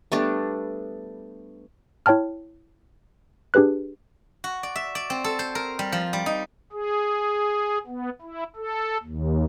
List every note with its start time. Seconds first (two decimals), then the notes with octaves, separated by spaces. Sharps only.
0.12 G3 A3 B3 D4
2.06 E4 C#5 G5 A5 F6
3.54 D4 G4 G#4 B4 F#6
4.44 F#4
4.63 D5
4.75 E5
4.95 D5
5.10 C4
5.24 A4
5.39 C5
5.55 A#4
5.79 G3
5.92 F3
6.13 G3
6.26 D#4
6.72 G#4
7.87 B3
8.22 E4
8.56 A4
9.03 D#2